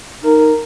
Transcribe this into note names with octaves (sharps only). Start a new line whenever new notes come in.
D#4 A#4